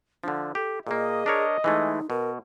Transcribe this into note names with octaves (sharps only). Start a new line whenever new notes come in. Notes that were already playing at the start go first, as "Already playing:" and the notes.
D3 F3 D4
G4 A4
A#2 A#3 G#4 D#5
D4 A#4 C#5
E3 G#3 A3 D#4
B2 A#4